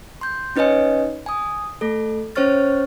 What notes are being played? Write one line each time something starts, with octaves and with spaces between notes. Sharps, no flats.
C6 G6
C#4 D#4 B4 C#5 D#5 G#5
G#5 D#6
A3 A4
C#4 C5 C#5 C#6 F6 A6